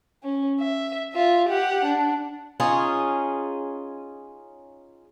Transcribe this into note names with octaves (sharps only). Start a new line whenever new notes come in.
C#4
E5
F4 E5
G4 F#5
D4
C#4 D#4 F4 G#4